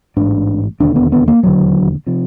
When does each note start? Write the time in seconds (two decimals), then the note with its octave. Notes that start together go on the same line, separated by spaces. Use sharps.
0.16 A1 G#2 D4
0.80 E1 D#2 D3 D4
0.96 B3
1.12 B3
1.28 A#3
1.43 E1 D#2 D3 F#3
2.07 C3 F3